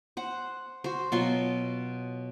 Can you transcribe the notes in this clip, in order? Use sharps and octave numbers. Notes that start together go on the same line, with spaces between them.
C5 F#5
F#4 C5
B2 F#3 F4 C6